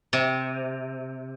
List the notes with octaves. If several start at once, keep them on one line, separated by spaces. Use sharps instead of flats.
C3